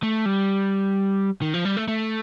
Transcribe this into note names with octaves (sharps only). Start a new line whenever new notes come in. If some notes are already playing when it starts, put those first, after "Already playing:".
A3
G3
D#3
F3
G3
A3
A3